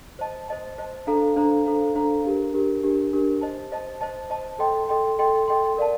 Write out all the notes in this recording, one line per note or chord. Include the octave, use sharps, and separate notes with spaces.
C5 D#5 A5
C5 D#5 A5
C5 D#5 A5
D4 A4 C5 F5 A#5
D4 A4 C5 F5 A#5
D4 A4 C5 F5 A#5
D4 A4 C5 F5 A#5
D4 G4 A#4
D4 G4 A#4
D4 G4 A#4
D4 G4 A#4
C5 D#5 A5
C5 D#5 A5
C5 D#5 A5
C5 D#5 A5
A4 D#5 G5 C6
A4 D#5 G5 C6
A4 D#5 G5 C6
A4 D#5 G5 C6
A#4 D5 F5 A5